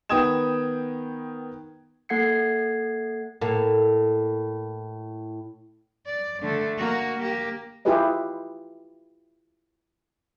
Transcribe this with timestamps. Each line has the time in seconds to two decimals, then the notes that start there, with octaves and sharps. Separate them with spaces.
0.09 D#3 B3 G5 D#6 G#6 E7
2.09 A#3 A4 F#5 G#6 C7 C#7
3.41 A2 A#3
6.06 D5
6.42 D3 A3
6.77 A#3 F#4
7.19 A#3 G4
7.85 E4 F4 G4 G#4 B4 D#5